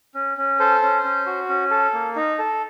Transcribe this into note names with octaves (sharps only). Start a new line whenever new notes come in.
C#4
C#4
A4 C5
C#4
C#4
F#4
C#4
A4
A#3
D#4
A4